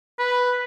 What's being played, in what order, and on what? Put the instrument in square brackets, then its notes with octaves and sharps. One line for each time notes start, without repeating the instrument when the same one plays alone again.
[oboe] B4